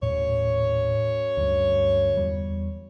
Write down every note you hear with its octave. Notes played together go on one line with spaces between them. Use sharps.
D#1 F#2 A2 C#5
D2 G2
E2 G3